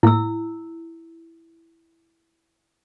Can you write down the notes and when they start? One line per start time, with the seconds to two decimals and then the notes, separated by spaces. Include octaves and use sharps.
0.03 A2 A#3 E4 E6